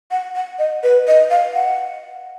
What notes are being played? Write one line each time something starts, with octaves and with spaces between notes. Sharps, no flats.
F#5
F#5
D#5
B4
D#5
F5
F#5